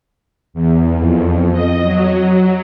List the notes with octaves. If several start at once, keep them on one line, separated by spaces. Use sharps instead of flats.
E2
F2
D#5
F#3